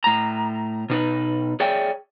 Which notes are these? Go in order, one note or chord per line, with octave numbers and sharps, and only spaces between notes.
A2 A#5
B2 D#4 B4
G#4 C#5 D5 E5 G5 G#5